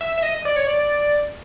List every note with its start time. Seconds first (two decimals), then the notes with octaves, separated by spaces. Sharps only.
0.01 E5
0.18 E5
0.23 D#5
0.45 D5
0.56 C#5
0.67 D5